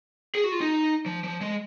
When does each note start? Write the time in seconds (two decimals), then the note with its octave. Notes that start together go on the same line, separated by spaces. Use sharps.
0.35 G#4
0.44 F#4
0.52 F4
0.61 D#4
1.06 F3
1.24 F3
1.41 G#3